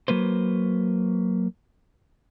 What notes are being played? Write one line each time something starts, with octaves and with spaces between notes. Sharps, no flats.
F#3 A#3 B4 C5